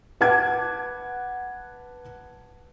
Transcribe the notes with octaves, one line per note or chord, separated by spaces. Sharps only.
B4 F#5 A5 D6 G#6